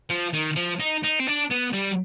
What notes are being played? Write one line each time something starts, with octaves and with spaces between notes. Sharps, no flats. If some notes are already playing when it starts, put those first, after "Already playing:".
F3
D#3
F3
D#4
D#4
C4
D4
B3
G3